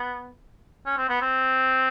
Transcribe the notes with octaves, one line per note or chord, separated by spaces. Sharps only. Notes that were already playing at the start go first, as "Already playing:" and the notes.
Already playing: B3
C#4
C4
B3
C4